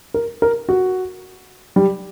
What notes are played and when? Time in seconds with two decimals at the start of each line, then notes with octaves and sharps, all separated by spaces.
0.14 A#4
0.42 A#4
0.69 F#4
1.76 G3